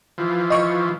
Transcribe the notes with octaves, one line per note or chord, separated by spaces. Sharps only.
E3 F3
D#5 C#6